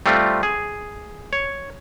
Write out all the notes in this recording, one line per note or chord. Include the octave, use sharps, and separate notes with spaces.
G3 A3 C4 F4
G#4
C#5